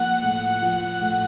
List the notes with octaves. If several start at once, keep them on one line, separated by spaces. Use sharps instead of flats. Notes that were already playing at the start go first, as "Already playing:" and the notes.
Already playing: F3 A#3 F#5
A2
F3
A2